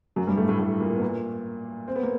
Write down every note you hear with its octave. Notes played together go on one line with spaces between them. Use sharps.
F#2 F#3
G2 G3
A2 A3
A2 A3
A2 A3
A#2 A#3
B3
A#2 A#3
C4
B3
A#3